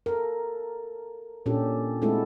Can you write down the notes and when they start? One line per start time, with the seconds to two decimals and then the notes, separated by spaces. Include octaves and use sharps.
0.06 A4 A#4
1.46 A#2 C#4 D4 G4 A4
2.02 G#3 A3 C4 E4 F#4 A4